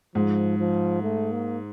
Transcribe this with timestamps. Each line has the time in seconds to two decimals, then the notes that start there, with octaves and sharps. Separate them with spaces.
0.15 G#2 F3
0.59 F3
1.02 A3
1.32 A#3